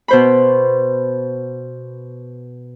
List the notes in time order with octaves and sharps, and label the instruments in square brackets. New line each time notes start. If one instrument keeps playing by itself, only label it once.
[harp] B2 C5 B5